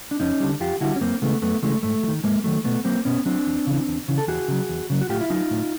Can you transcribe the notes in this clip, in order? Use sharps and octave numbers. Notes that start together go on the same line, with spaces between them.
D4
F2 C#4 D#4
D3 G3
F2 F4 G4
D3 G3 E4 F#4
C#4
F#2 A#3 C4
C#3 E3 G#3 A3 B3
F#2 A3 B3
C#3 E3 G#3 A3
G#2 A3
F#3
D#3
G#2 G#3 A#3
D#3 F#3 A3
B2 A3 B3
F#3 A#3 C4
B2 B3 C#4
F#3 C4 D4
E2
C#3 E3
E2
C#3 E3
A4
E2 F#4 G#4
C#3 F#3
E2
C#3 F#3
F#4
A2 F4 G4
E4
F#3 D#4 F4
A2